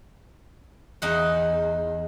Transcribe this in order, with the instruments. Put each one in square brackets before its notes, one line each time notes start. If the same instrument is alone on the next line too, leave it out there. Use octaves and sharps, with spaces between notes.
[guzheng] E2 D#4 F#5